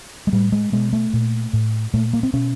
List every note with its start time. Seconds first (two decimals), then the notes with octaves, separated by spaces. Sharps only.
0.27 G#3
0.32 A2 G3
0.52 G#3
0.73 B2 G#3
0.93 A3
1.13 A#2
1.53 A2
1.94 A#2 A3
2.13 A#3
2.23 C4
2.33 B2 C#4